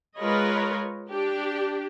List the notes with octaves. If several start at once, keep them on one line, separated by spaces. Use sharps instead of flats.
G#3 F4 A#4 B4 C#5 D#5
D4 G4